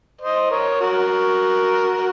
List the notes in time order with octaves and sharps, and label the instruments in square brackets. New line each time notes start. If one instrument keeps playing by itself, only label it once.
[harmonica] C5 D#5
A#4 C#5
F#4 A#4